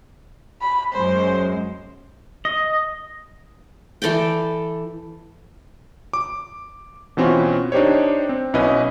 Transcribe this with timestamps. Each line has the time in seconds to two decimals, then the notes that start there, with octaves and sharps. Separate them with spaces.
0.61 B5
0.93 F#2 G#3 C5
2.45 D#5
4.02 E3 A4 D5 G5
6.13 D6
7.17 B2 E3 C4 C#4 F4 F#4
7.72 D4 D#4 G4 C5 C#5
8.29 C4
8.54 B1 C#4 E4 B4 D#5